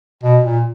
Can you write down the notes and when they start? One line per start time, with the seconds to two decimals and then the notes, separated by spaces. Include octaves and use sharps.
0.23 B2
0.44 A#2